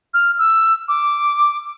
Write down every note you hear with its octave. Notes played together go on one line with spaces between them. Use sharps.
F6
E6
D6